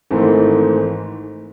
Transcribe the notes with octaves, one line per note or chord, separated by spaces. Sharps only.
G#1 G#2 E3 A3